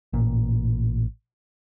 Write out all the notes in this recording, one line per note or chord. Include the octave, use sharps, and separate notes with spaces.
A1 A#2